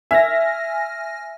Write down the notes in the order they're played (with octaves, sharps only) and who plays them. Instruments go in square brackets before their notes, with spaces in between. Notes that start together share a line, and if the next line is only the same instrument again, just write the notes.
[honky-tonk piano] E5 [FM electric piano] G#5 F6 A#6